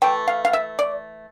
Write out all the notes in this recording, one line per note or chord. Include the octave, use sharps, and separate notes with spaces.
E3 A3 G5
F5
F5
E5
D5